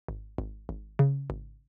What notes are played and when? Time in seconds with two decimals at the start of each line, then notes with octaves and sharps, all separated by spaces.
0.08 G#1
0.38 G#1
0.69 G#1
0.99 C#3
1.30 G#1